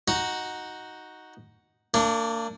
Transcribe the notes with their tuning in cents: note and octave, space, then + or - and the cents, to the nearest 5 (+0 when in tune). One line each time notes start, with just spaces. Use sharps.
D#4 +5 F#4 +0
A#3 -35 D4 +0